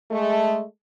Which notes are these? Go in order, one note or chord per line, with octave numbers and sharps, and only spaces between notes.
G#3 A3